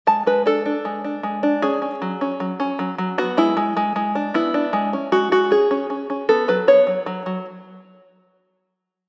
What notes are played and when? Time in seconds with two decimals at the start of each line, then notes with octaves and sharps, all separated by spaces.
0.07 G#3 A5
0.26 G#3 B4
0.46 D4 A4
0.66 D4
0.85 G#3
1.04 D4
1.23 G#3
1.43 D4
1.62 C#4 G#4
1.82 C#4
2.02 F#3
2.21 C#4
2.40 F#3
2.60 C#4
2.79 F#3
2.98 F#3
3.18 B3 F#4
3.37 G#3 E4
3.57 G#3
3.77 G#3
3.96 G#3
4.15 D4
4.34 B3 E4
4.54 D4
4.73 G#3
4.93 C#4
5.12 G#3 F#4
5.32 G#3 F#4
5.51 C#4 G#4
5.71 C#4
5.90 C#4
6.10 C#4
6.29 B3 A4
6.48 F#3 B4
6.68 B3 C#5
6.87 F#3
7.06 F#3
7.26 F#3